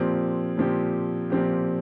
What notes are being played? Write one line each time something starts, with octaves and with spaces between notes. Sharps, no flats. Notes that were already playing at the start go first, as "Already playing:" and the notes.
Already playing: A#2 F3 C4 G4
A#2 F3 C4 G4
A#2 F3 C4 G4